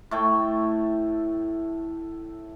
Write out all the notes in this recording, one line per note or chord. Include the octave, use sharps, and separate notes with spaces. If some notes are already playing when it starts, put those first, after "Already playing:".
A2 A3 G5